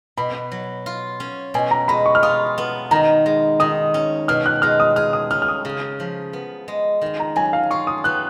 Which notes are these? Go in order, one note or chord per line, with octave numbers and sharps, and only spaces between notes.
B2 B5
F#3
F4
C#4
B2 G#5
A#5
G#3 B5
C#6
F6
F4 D#6
B3
D#3 A#5
G#3
D#3 D#6
C#4
B2 F6
F#6
G#3 F6
D#6
G#4 F6
D#6
C#4 F6
F6
D#6
C#3
F3
B3
G#3
D#3
A#5
F#3 G#5
F5
F4 C#6
D#6
B3 F#6